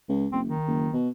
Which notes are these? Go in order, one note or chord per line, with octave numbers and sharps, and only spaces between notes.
C#2
F#1 C4
D#3
F#1
B2